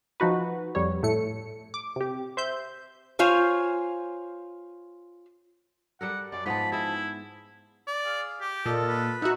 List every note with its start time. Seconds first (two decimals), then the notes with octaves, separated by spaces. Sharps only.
0.20 F3 D#4 F#4 B4
0.75 F2 G3 C#5
1.03 A2 A3 C#7
1.74 D6
1.96 C3 G4
2.37 C5 E5 G6
3.19 F4 C5 C#5 G#5
6.01 G3 A4 A#4 F#5
6.32 F#2 D5
6.46 G#2 F3 B3 D#4 A5 B5
6.72 E4 G#4 E5
7.87 D5
8.05 G#4 F5
8.41 G4
8.66 A#2 F4 A4 D#5
8.88 B4
9.22 D#4 F#4 E5 F#5